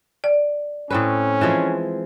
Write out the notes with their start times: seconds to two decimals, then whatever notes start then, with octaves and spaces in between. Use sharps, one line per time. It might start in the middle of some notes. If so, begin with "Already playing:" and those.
0.24 D5
0.90 A2 C4 C#4 B4
1.41 E3 F3 G#3